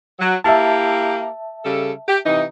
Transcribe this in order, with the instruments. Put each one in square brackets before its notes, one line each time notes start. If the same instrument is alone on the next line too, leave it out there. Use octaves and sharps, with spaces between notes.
[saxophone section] F#3
[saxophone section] A#3 E4 G4 [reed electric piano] E5 A5
[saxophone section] C#3 G3 A4
G4
C3 E3 D#4